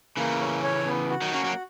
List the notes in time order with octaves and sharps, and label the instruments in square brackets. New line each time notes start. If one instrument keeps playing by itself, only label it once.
[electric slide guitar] C#3 E3 [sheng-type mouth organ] A#3
[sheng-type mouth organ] C#4
C#5
B3
F#4
[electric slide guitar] D#3 F#3
[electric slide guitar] F#3 A#3 [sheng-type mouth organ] C#4
[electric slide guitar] F#3 A#3